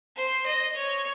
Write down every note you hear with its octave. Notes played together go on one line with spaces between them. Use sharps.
C5
D#5
C#5